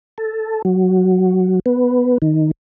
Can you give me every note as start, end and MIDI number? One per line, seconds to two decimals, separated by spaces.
0.18 0.62 69
0.65 1.60 54
1.66 2.18 59
2.22 2.51 51